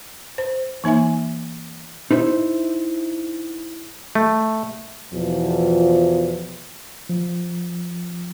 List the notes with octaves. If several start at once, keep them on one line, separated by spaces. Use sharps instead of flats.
C5
E3 A#3 D#4 E5 G#5
D#4 E4 C5 E5
A3
E2 B2 F3
F3